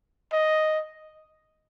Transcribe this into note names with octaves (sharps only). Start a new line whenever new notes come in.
D#5